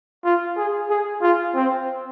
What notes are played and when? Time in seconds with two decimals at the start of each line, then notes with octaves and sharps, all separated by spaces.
0.24 F4
0.57 G#4
0.90 G#4
1.22 F4
1.55 C4